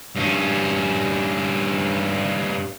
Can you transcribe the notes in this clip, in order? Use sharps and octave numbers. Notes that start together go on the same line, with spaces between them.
G2 C#4